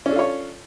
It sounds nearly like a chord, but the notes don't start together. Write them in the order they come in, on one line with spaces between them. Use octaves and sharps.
C#4 D4 A4 F4 C#5